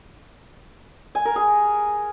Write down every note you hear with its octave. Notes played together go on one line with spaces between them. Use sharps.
G#5
A#4
G#4